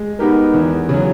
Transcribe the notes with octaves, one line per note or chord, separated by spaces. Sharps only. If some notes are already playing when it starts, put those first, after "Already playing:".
Already playing: G#3
B3 D#4 G4 A#4
E2
C#3 F#3